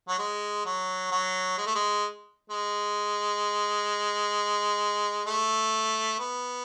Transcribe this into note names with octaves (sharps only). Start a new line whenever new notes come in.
F#3
G#3
F#3
F#3
G#3
A3
G#3
G#3
A3
B3